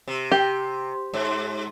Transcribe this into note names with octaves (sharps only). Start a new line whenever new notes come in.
C3
G4
G#2